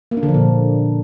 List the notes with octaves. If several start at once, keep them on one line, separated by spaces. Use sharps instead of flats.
A#3
D4
D3
F3
A#2